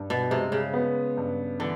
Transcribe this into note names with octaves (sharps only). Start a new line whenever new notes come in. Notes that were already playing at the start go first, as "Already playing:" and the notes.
Already playing: G2
B2
C3 G#3
C#3
B3
G2
D3 E3